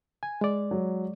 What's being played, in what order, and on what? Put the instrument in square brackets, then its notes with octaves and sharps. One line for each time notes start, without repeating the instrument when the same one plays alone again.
[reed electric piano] G#5
G#3 D5
[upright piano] F#3